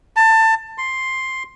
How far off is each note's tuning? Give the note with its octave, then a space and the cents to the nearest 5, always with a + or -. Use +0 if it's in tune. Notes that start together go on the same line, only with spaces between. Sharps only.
A5 +20
C6 +5